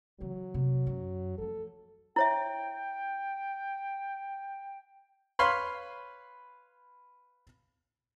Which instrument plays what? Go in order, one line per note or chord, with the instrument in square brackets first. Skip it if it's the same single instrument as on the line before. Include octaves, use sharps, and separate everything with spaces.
[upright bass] C#3 E3 [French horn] F#3
[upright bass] C3 A#3
F#2
[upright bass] F3 A3 [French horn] A4
[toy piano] E4 C#5 E5 [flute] G5
[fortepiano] B4 C#5 F5 B5 C6